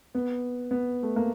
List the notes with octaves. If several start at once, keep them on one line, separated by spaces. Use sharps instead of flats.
B3
B3
A3
A#3